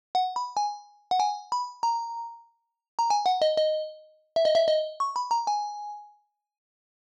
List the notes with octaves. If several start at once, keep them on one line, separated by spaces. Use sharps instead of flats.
F#5
B5
G#5
F#5
G#5
B5
A#5
A#5
G#5
F#5
D#5
D#5
E5
D#5
E5
D#5
C#6
B5
A#5
G#5